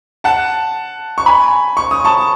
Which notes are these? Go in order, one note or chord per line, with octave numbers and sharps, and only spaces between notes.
F#5 A5
C#6
G#5 B5
C#6
D#6
A5 C#6